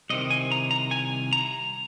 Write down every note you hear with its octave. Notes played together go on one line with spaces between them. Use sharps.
C2 C3 D#3 D#5
G#5
A#5
A#5
G#5
A#5